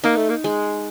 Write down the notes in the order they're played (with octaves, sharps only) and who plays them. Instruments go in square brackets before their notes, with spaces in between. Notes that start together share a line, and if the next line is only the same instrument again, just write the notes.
[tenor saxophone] A#3 [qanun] D#4
[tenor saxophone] A3
A#3
[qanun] G#3